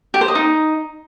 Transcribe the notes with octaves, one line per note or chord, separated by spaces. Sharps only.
G4
C5
D#5
D#4